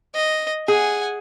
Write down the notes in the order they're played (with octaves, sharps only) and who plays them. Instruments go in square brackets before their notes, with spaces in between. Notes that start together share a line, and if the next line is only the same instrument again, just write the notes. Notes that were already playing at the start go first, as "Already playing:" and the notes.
[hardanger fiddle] D#5
[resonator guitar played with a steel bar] G#4 [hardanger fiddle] F#5 G#5